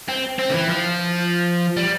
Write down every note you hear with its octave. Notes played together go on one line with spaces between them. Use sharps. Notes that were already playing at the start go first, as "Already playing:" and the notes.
C4
C4
D3
E3
F3
G3